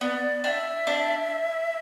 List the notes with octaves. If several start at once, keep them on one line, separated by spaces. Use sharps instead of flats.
B3 D5
D4 E5 G5
D4